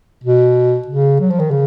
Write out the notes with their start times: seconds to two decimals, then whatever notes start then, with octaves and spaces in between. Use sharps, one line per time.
0.24 B2
0.87 C#3
1.20 F#3
1.30 F3
1.40 D#3
1.51 C#3